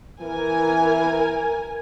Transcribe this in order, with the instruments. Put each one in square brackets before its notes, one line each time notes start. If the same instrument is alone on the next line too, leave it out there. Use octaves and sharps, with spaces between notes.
[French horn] E3 [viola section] A#4 G#5